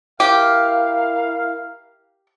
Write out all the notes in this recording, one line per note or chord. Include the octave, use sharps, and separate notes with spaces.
E4 G4 A#4 F5